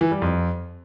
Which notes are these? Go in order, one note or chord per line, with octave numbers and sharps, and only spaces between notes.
E3
G3
F2